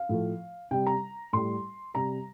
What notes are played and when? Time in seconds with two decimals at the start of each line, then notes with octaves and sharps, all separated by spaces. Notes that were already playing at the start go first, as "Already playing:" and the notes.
Already playing: F5
0.09 A2 F3 A3
0.71 C3 G3 G5
0.87 A#5
1.33 A2 G3 C6
1.94 C3 G3 A#5